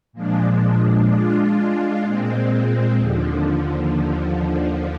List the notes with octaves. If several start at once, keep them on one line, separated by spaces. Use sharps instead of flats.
A#2 F3 G#3 D4
G#3 D4 F4
A#2 G#3 C4
D#2 D3 F3